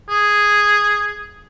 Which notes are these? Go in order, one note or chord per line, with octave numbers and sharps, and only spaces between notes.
G#4